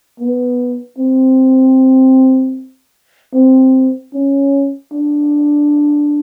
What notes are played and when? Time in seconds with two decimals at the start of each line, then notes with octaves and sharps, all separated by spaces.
0.20 B3
0.98 C4
3.34 C4
4.14 C#4
4.92 D4